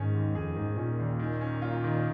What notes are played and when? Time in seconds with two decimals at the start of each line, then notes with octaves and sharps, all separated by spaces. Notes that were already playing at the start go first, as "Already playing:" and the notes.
Already playing: G#2 D#3 C#4 G#4
0.15 D#2
0.35 F2 G#4
0.56 G#2 D#3
0.70 G#2
0.77 A#2 C#4
0.99 D#2
1.19 D#3
1.41 C#4
1.62 F4
1.84 D#3